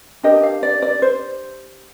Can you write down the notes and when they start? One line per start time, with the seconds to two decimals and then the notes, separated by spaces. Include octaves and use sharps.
0.23 D4 G4 A#4 D#5
0.43 F5
0.63 D5
0.82 D5
1.02 C5